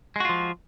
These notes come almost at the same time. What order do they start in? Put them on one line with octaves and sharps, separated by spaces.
G#3 F#4 F4 F3